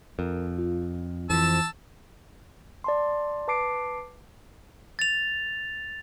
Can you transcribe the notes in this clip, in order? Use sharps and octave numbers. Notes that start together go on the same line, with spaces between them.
F2 A#4
F4
F2 E3 F3 A5 E6
D5 A5 C6
B4 A5 D6 C7 D7
A6 F7